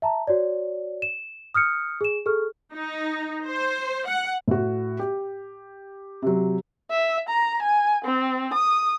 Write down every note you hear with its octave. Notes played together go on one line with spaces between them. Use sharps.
E5 A5 A#5
F#4 C#5 D5
E7
D#6 F6 G6 C#7
G#4 E7
G#4 A4 C#6 F6
D#4
C5
F#5
A2 F#4
G4
C3 F#3
E5
A#5
G#5
C4
D#6